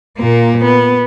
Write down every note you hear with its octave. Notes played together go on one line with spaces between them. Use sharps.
A#2 A#3
B3